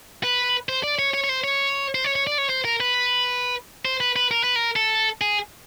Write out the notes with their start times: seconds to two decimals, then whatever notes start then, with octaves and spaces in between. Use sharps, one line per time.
0.23 B4
0.69 C5
0.83 D5
0.99 C#5
1.14 C#5
1.24 C#5
1.29 C5
1.44 C#5
1.95 C5
2.04 C#5
2.15 C#5
2.27 D5
2.38 C#5
2.50 C5
2.65 A#4
2.80 B4
3.85 C5
4.00 B4
4.16 B4
4.31 A#4
4.44 B4
4.56 A#4
4.76 A4
5.21 G#4